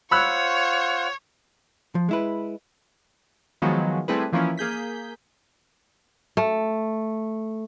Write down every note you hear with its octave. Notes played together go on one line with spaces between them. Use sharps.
F4 C5 C#5 F#5 B5 E6 F#6
F3
G#3 E4 B4
D#3 F3 F#3 G#3 B3
G3 A3 C4 E4 G#4 B4
E3 F3 A#3 C#4 E4
A#3 G#4 G6 B6
A3